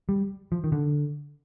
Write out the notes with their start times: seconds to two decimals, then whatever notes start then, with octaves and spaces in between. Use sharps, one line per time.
0.09 G3
0.52 F3
0.64 D#3
0.72 D3